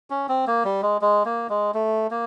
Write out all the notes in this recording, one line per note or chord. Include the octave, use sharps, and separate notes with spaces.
C#4
C4
A#3
G3
G#3
G#3
A#3
G#3
A3
A#3